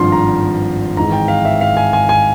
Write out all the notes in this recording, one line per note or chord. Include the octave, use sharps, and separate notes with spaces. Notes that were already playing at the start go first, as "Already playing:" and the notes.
Already playing: G#1 G2 F3 C6
A#5
G#1 G#2 E3 A#5
G5
F5
E5
F5
G#5
G#5
G#5